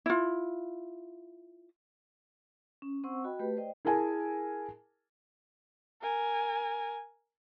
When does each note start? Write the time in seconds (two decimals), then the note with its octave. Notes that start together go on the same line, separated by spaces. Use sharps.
0.06 E4 F4
2.82 C#4
3.04 C4 C5 F#5 C#6 E6
3.24 F#4 D#5 G5 B5
3.39 A3 G4 B4
3.57 C5 D5 D#5 G5
3.85 E4 G#4 A#4 G#5 A5
6.02 A#4 G#5